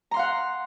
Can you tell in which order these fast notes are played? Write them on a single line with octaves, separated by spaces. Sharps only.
A#5 C6 F5 F#5